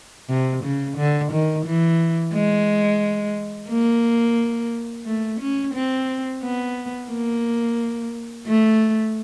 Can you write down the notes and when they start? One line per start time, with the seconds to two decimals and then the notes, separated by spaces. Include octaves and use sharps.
0.29 C3
0.63 C#3
0.97 D3
1.32 D#3
1.66 E3
2.34 G#3
3.70 A#3
5.06 A3
5.40 C#4
5.74 C4
6.43 B3
7.10 A#3
8.47 A3